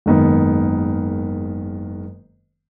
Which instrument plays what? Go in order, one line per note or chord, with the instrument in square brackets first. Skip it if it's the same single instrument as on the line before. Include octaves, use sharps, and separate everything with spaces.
[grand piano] F#1 G#2 D#3 B3